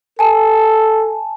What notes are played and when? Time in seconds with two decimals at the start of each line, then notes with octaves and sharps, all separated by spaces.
0.19 A4 G#5 A5